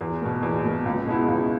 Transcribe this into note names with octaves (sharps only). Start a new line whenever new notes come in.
E2
B2 A#3
E2
B2 A#3
C#2
B2 G#3 B3 E4
C#2